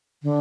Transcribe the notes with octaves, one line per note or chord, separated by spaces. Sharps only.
D3